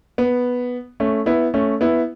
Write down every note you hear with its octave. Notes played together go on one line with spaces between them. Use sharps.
B3
A3 C#4
B3 E4
A3 C#4
B3 E4